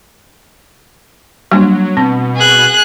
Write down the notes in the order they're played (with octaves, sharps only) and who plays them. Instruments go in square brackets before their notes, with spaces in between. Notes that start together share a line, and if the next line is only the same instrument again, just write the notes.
[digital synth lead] F#3 [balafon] G3 A#3 D4
[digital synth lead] B2 [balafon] C4
[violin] G#4 F#6